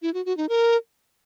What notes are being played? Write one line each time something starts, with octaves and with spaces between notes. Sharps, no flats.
E4
F#4
F#4
D#4
A#4